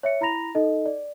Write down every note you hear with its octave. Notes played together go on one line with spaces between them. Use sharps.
C#5 E5 C#7
E4 A#5 B5 A#6 F7
D#4 A4 D#5
D5